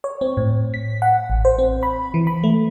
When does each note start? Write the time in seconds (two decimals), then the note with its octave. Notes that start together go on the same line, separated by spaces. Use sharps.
0.04 C#5
0.21 C4
0.37 A2
0.74 B6
1.02 F#5
1.30 A1
1.45 C5
1.59 C4
1.83 B5
2.14 E3
2.27 B5
2.44 A3